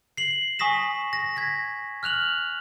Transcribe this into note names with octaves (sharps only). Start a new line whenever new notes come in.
C7 F#7
G#5 C#6 D#6 A#6 B6 E7
A#6
G#6 A#6 B6
F6 F#6 F7 F#7